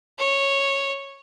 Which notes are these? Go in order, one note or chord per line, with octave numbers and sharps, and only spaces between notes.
C#5